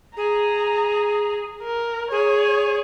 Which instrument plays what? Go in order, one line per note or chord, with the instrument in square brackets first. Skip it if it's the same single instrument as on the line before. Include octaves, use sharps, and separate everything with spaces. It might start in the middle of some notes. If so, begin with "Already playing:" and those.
[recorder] G#4 [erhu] A#5
[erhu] A#4
[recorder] G#4 [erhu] C#5